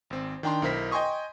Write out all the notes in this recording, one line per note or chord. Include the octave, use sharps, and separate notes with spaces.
G#1 C4
D#3 D4 G5 A#5 C6
B1 E4 A#4 C5 B6
D#5 G5 G#5 C6 C#6 D#6